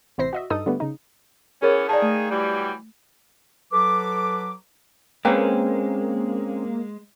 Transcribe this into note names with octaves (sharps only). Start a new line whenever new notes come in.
A1 C3 E4 C5 A#6 C7
F#4 D#5 E5
G2 D#4 A4 D#6
D3 G3 A3 B3
C#3 D#4
E3 B3 C#4 G#4 A#4 C#5
D#3 A#3 G#4 D5 A5
A3
E3 F#3 G3
F#3 A4 B4 D6
G#3 A#3 C4 C#4 B4 C5 G5